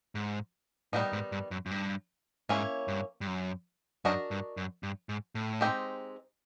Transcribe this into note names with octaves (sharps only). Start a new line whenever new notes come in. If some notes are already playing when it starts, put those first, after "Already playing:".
G#2
A2 D#3 G3 B3 D#4
G#2
G2
F#2
F#2
G2
G#2 A#3 C#4 E4
G2
G2
F#2
F#2 D4 F#4 A#4 D#5
G2
F#2
G2
G#2
A2
G#3 C4 D#4 G4